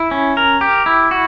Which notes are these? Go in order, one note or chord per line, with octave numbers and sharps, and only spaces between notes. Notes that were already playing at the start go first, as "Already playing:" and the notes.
Already playing: E4
C#4
A#4
G4
E4
F#4